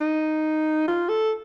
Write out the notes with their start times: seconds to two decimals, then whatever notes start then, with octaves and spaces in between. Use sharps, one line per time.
0.01 D#4
0.88 F4
1.09 A4